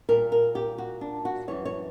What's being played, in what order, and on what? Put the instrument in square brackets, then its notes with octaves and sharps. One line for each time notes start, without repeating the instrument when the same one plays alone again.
[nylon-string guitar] A#2 G3 A#4
A#4
G4
F#4
D4
F#4
F#2 E3 G3 C#5
C#5